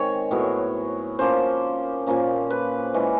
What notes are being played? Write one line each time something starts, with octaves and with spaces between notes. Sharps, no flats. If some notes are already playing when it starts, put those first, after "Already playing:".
Already playing: D#3 G#3 C4 C#5
A2 F#3 B3
F3 A#3 C#4 C5
A#2 F3 A#3 C#4
B4
E3 G#3 C#4